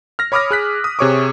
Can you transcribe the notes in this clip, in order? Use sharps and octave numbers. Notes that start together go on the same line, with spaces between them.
F6 A#6
C#5 B5 D6 D#6 F6 A#6
G#4 F#6 B6
D#6
C3 G#4 C#5 C#6 D6